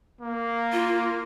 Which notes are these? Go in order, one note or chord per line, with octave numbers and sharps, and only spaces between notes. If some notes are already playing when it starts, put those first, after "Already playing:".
A#3
F4